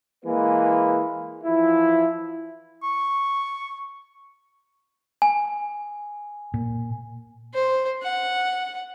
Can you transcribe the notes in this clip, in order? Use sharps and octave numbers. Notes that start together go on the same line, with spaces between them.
E3 G#3 A#3 B4
E3 F3 E4
C#6
G#5
A#2
C5
F#5